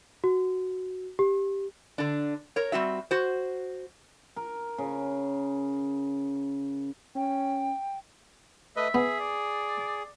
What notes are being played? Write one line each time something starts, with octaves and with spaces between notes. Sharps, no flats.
F#4
G4
D3 D4
A#4 C#5
G3 C4 F#4 E5
F#4 C5
A#4
C#3
C#4 G5
A3 B4 D#5 E5
B3 G#4
D5